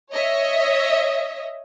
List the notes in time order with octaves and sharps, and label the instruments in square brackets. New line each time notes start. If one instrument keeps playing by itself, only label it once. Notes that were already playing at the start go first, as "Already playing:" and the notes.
[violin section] C#5 D#5 E5